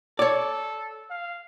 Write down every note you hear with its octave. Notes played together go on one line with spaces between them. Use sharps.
A4 C#5 D5
F5